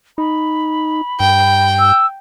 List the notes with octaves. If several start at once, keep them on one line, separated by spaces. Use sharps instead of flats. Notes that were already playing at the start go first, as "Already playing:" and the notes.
D#4 B5
G2 G5
E6